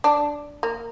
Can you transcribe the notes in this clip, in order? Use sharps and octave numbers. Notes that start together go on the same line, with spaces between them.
D4
A#3